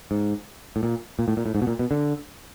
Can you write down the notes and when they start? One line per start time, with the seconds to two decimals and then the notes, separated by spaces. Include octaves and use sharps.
0.11 G#2
0.76 A2
0.83 A#2
1.19 A#2
1.28 A2
1.37 A#2
1.46 A2
1.55 G#2
1.62 B2
1.67 A#2
1.79 B2
1.91 D3